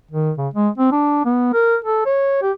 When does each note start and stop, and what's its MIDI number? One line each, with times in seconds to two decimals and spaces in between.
0.11 0.31 51
0.38 0.48 49
0.54 0.69 56
0.78 0.91 60
0.92 1.23 62
1.25 1.48 59
1.54 1.76 70
1.85 2.02 69
2.06 2.38 73
2.42 2.52 67